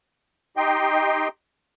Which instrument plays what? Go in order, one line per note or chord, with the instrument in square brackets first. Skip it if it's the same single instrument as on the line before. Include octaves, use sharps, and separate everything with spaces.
[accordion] D#4 G4 D#5 G5 C6